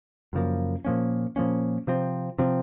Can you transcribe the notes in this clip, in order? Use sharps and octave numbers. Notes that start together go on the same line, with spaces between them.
F#2 C#3 F3 A#3
A#2 F3 A#3 C#4
A#2 F3 A#3 C#4
C3 F3 C4
C3 F3 C4